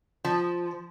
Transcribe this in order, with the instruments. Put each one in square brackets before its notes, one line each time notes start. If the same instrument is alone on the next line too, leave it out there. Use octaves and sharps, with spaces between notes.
[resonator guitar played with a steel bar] F3